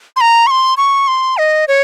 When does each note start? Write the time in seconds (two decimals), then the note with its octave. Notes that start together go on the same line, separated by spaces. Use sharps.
0.16 C6
0.21 A#5
0.47 C#6
0.51 C6
0.77 C#6
1.08 C6
1.38 D#5
1.68 C#5